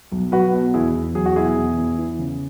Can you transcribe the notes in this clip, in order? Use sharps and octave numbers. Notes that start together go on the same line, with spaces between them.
B1
F#3 F#4 B4
B2
E2 E4 G#4
E2
F#3 G#4
F#4
B2 E4 G#4
E2
E2
E3
C#3